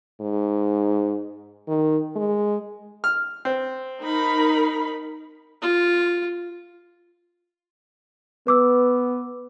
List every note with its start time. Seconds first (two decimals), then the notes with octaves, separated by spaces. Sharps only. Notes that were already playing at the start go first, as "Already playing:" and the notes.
0.21 G#2
1.68 D#3
2.16 G#3
3.04 F6
3.45 C4
4.02 D#4 A#4 B5
5.62 F4
8.47 B3 B4 D6 E6